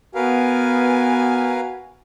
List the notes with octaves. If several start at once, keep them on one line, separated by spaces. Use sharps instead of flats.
B3 F#4 A#4 B4 F5 G#5